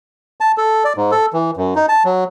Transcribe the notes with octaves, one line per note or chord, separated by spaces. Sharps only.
A5
A4
D5
G#2
A4
E3
F#2
D#4
A5
F#3